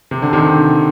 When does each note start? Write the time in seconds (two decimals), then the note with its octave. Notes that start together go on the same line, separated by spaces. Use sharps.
0.11 C3
0.22 D3
0.33 C3 D#3